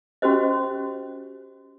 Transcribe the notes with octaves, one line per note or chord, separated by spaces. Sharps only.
C#4 F#4 G4 C5 D#5